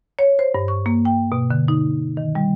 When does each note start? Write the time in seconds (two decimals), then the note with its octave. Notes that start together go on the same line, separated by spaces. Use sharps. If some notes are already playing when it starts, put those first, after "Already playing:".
0.19 C#5
0.39 C5
0.55 G2
0.68 C#6
0.86 A#3
1.05 G5
1.32 B2
1.51 D3
1.68 D#4
2.17 D#3
2.35 G3